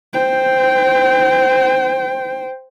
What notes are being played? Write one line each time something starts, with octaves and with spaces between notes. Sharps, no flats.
C5 G5